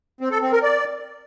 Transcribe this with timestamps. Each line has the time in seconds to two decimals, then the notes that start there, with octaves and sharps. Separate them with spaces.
0.21 C4
0.31 A4
0.42 C4
0.52 A#4
0.63 D5